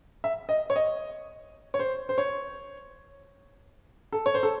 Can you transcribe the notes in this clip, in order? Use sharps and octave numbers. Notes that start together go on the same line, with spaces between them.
E5
D#5
C#5
D#5
C#5
C5
C5
C#5
A4
C#5
C5
A4